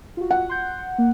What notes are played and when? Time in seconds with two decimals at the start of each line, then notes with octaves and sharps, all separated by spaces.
0.17 F4 F#4
0.31 F#5
0.49 C6 G6
0.98 A#3